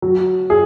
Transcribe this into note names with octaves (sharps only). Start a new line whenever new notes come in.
F#3
G#4